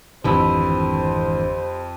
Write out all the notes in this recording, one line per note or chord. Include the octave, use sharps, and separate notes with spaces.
G#1 F2 D3 E3 G4 C5 B5 E6